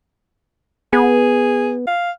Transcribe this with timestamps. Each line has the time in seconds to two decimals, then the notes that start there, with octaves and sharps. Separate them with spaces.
0.93 B3 G#4
1.87 F5